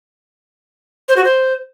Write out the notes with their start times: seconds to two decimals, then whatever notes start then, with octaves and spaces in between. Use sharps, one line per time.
1.08 C5
1.16 F#4
1.24 C5